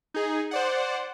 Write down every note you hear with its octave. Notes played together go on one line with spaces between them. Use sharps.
D#4 G#4
C5 D5 F#5